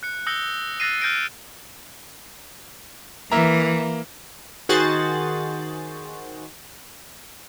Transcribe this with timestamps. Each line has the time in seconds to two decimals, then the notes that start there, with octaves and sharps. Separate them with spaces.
0.03 F#6 C#7
0.26 D#6 E6 G6 A#6 C#7 G7
0.80 E6 F#6 A6 A#6 C7 D#7
1.01 F6 G6 A6 A#6 D7 D#7
3.32 E3 A#3 E5 A#5
4.69 D#3 F#4 G#4 C5 F#6 A6